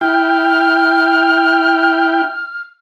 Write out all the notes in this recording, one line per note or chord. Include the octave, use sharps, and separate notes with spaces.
E4 G5 F6